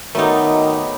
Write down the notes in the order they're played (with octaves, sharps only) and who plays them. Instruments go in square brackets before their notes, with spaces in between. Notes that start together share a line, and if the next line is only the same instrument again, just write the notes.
[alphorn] D#3 [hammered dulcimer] F#3 B3 D6 [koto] A3 D#4 [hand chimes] A#4 D#5